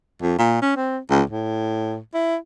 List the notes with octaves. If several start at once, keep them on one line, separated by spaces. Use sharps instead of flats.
F2
A#2
C#4
C4
C#2
A2
E4